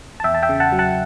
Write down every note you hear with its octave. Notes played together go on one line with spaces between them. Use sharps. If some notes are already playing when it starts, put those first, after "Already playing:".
A5
E2 E5 G5
A5
E5 G5
C#3
F#5 A5
F#3
F#5 A5